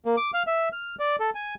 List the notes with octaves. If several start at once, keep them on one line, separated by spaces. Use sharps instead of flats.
A#3
D6
F5
E5
F6
D5
A4
G#5